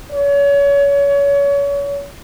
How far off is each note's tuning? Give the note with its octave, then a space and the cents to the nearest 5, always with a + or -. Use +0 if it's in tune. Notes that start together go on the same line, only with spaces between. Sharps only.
C#5 +30